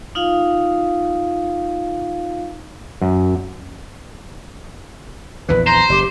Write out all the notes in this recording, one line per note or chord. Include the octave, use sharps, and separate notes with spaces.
D#4 F4 F5
F#2
A#1 E2 E3 B4
C5 A#5
F#1 G4